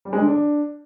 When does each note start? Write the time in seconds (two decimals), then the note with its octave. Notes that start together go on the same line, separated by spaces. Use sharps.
0.05 G3
0.13 G#3
0.20 D3
0.28 D4